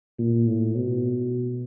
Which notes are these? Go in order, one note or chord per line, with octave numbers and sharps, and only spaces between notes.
A#2
A2
B2